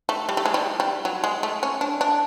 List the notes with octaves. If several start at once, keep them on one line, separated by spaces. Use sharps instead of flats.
A3
G3
A3
G#3
G3
G3
F#3
G#3
A3
C#4
D4
D4